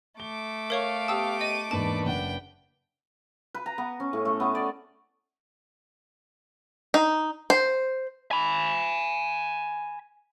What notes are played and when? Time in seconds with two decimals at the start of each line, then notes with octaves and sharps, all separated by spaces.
0.20 A3 D6 G7
0.70 A#4 C#5 F5 C#6
1.08 B3 G4 A5 D#6 E6
1.41 D#5 D#7
1.71 E2 G#2 A#3 D4 B4 A5
2.05 F#1 F#5 G5
3.55 B4
3.66 A#5
3.78 B3
4.00 C#4
4.13 A2
4.25 A3
4.40 B3
4.55 D5
6.94 D#4
7.50 C5
8.31 G#5 B5